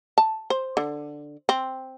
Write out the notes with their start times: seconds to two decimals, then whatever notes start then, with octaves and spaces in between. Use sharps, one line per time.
0.18 A5
0.50 C5
0.77 D3
1.49 C4